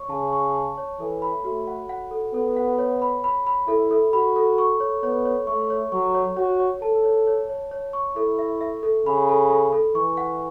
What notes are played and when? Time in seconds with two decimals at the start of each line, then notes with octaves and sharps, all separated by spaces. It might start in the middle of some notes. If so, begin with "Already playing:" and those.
Already playing: C#5 C#6
0.09 C#3 A5
0.33 C#6
0.54 A5
0.78 C#5
1.00 E3 A4
1.22 B5
1.45 A3 F#4
1.67 F#5
1.89 F#5
2.11 A4
2.34 B3 A4
2.56 F#5
2.78 C#5
3.02 B5
3.24 B5
3.47 B5
3.68 E4 A4
3.91 A4
4.13 F#4 B5
4.36 A4
4.58 C#6
4.80 C#5
5.03 B3 C#5
5.25 C#5
5.47 A3 C#6
5.70 C#5
5.92 F#3 C#6
6.15 C#5
6.37 F#4 C#5
6.59 C#5
6.82 A4 A5
7.04 C#5
7.27 C#5
7.49 C#5
7.71 C#5
7.93 C#6
8.16 E4 A4
8.39 E5
8.61 E5
8.83 A4
9.06 C#3 B5
9.29 A4
9.50 A4
9.72 A4
9.95 E3 C#6
10.17 F#5